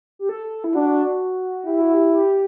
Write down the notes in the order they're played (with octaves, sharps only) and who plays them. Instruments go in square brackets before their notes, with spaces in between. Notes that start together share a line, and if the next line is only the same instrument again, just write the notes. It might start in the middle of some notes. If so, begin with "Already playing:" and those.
[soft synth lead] G4
A4
E4
[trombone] D4 [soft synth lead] F#4
[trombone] E4 [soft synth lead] G4
[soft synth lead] F#4
G4
G4